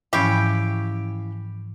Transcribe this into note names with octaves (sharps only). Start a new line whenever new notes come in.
G#2 E3 F3 C#4 E4 G4 F5